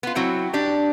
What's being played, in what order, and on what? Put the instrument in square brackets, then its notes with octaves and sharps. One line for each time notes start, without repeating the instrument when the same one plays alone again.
[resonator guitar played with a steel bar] B3 F4
F#3 C4 E4 F#5
D4 G4